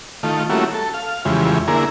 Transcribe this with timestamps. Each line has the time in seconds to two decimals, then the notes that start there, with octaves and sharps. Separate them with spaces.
0.23 D#3 A3 F4
0.49 G3 A3 A#3 C#4 E4 F#4
0.74 A4
0.94 F5
1.25 F2 C#3 E3 G3 G#3
1.68 D3 A#3 E4 G#4 A#4